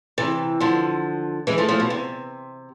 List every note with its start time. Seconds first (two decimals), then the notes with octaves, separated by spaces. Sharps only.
0.18 C3 E3
0.60 D3 F3
1.47 E3 G#3
1.58 F3 A3
1.69 F3 A3
1.80 B2
1.90 C3